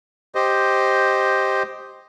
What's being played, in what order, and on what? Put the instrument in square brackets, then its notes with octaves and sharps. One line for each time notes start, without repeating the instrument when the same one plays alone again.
[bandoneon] G4 C5 D#5